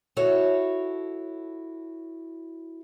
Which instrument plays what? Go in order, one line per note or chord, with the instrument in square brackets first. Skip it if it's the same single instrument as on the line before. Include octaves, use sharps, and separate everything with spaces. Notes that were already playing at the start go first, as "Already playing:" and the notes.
[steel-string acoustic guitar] E4 F#4 A4 C#5